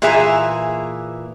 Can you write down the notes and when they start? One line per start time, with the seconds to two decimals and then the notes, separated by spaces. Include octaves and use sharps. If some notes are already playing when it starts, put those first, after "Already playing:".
0.02 A#2 E3 G#4 E5 G#5 A#5